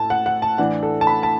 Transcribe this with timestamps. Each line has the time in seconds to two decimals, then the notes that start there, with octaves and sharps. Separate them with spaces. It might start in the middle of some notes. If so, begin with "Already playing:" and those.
Already playing: A2 A3 E4 A5
0.10 F#5
0.26 F#5
0.42 A5
0.58 A2 E3 D4 F#5
0.83 A4
1.01 A5
1.07 B5
1.23 A5